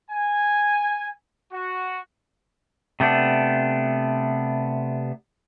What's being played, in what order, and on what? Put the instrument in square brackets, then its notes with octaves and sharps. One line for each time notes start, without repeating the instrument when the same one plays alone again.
[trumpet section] G#5
F#4
[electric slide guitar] C3 A3 B3 D4